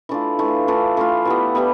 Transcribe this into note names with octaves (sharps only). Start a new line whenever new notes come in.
E3 A3 D4 F4
E3 A3 D4 F4
E3 A3 D4 F4
E3 A3 D4 F4
E3 G3 B3
E3 G3 B3